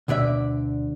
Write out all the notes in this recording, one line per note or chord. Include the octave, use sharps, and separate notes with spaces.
D2 B2 D3 D5 E5